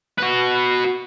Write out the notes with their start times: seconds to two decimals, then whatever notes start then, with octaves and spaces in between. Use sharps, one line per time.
0.18 F#4 B4